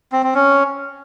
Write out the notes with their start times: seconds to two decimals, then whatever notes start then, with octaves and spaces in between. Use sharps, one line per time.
0.12 C4
0.23 C4
0.34 C#4